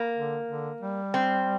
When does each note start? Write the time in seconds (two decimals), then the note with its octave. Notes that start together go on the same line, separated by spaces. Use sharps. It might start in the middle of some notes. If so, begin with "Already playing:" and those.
Already playing: A#3
0.15 D3
0.48 D3
0.81 G3
1.14 C4